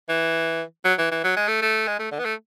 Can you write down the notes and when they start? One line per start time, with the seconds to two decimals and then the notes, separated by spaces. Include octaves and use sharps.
0.09 E3
0.85 F#3
0.99 E3
1.11 E3
1.24 F#3
1.37 G#3
1.48 A3
1.62 A3
1.88 G#3
1.99 A3
2.12 D3
2.19 B3
2.25 A3